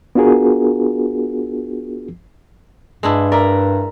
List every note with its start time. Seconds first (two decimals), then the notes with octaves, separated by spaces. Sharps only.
0.15 B3 D4 F4 F#4 G#4 A#4
3.03 G2 G#3 D4 E4
3.32 A#4 D5 E5 A#5